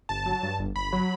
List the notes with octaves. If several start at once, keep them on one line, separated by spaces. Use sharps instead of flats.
G1 A5
F#3
G2
G1
G1 B5
F#3